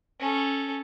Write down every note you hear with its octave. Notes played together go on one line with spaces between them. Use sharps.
C#4 A4